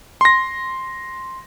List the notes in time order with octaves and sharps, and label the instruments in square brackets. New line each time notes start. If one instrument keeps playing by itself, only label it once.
[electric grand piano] C6 A#6